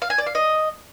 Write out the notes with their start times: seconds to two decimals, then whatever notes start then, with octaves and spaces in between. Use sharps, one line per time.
0.02 F5
0.10 G#5
0.18 D5
0.27 F5
0.35 D#5